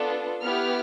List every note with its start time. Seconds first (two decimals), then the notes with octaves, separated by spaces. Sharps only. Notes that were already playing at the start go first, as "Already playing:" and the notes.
Already playing: B3 D4 F4 A4
0.42 B3 E4 G4 F6